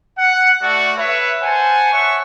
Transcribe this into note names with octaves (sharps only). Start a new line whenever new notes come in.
F#5
A3 F#4 D5 C#6
B4 C#5 E5
C5 F#5 G#5 A5
C#5 E5 F#5 C#6